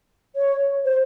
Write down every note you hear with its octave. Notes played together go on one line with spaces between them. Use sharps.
C#5
C5